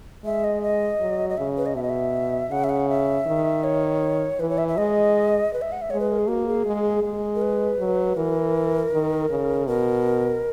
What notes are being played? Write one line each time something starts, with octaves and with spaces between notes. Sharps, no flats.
G#3 E5
D#5
D#5
F#3
D#5
C#3 E5
B4
D#5
B2 E5
D#5
E5
C#3 F#5
E5
F#5
E5
D#3
C#5
E3 B4
C#5
E5
E5
G#3 D#5
B4
E5
F#5
E5
G#3 C#5
B4
A#4
G#4
A#3 F#4
G#4
G#3
G#3
A#4
B4
F#3
E3 A#4
D#3
C#3
B2 A#4